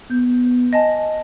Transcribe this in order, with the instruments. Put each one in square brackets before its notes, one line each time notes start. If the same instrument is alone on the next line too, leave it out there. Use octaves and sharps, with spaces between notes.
[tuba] B3 [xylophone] G6
[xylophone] D#5 G#5 A5